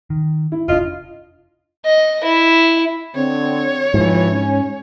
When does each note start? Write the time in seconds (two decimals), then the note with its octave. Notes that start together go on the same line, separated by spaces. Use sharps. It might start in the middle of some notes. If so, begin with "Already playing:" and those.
0.10 D#3
0.52 E4
0.68 F1 D4 F4 D#5
1.86 D#5
2.24 E4
3.15 D3 C4 C#5
3.94 G#2 C3 E3 F3
4.31 C#4